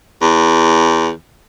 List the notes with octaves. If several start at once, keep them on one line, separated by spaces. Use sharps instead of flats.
E2